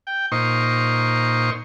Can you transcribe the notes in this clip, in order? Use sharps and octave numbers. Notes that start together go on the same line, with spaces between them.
G5
A#2 D#4 C5 C#6